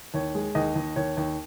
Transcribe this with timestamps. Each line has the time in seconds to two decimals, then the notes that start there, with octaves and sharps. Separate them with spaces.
0.14 D#2 C#5
0.35 G#3
0.55 D#2 D#5
0.75 D#2
0.96 D#2 C#5
1.17 D#2